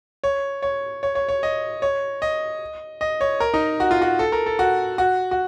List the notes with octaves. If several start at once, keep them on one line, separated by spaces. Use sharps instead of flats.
C#5
C#5
C#5
C#5
C#5
D#5
C#5
D#5
D#5
C#5
A#4
D#4
F#4
F4
F#4
A4
A#4
A4
F#4
F#4
F#4